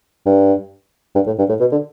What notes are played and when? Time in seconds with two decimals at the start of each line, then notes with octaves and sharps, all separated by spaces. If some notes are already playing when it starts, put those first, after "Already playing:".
0.26 G2
1.15 G2
1.26 A2
1.38 G2
1.49 A2
1.60 B2
1.72 D3